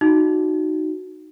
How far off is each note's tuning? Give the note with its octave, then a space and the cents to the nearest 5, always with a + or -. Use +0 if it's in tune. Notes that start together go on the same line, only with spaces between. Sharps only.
D#4 -5 F#4 +0